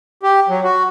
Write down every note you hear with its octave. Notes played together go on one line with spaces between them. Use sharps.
G4
F#3
F#4